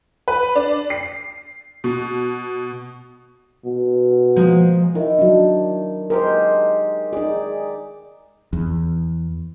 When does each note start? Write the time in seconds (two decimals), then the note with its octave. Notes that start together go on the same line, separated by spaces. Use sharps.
0.28 B4
0.55 D4
0.90 C7
1.84 B2
3.65 B2
4.36 F3 G#3 A#3
4.95 D#3 E4
5.19 F#3 D4
6.10 G#3 G4 A#4 C5
7.13 D#4 G#4 D5
8.53 E2